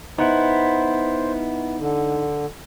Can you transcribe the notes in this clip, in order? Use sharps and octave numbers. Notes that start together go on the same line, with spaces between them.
B3 D#4 E4 C5 F#5
D3